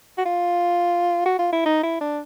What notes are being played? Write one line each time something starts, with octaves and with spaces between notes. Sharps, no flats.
F#4
F4
F#4
F4
E4
D#4
E4
D4